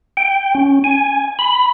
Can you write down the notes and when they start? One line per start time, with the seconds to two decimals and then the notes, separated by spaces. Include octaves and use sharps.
0.17 G5
0.55 C#4
0.84 G#5
1.39 B5